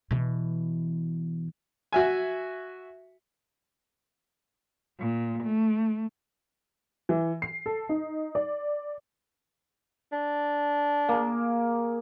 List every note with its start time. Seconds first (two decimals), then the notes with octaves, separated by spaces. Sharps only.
0.11 B2 E3
1.92 F#4 E5 G#5
5.00 A#2
5.44 A3
7.09 E3
7.42 C7
7.66 A4
7.89 D#4
8.35 D5
10.12 D4
11.09 A#3 G#4